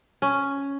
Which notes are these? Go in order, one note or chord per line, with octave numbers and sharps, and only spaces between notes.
C#4